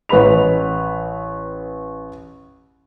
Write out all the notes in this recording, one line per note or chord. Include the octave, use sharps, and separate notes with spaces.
A1 B4 D#5 B5 F7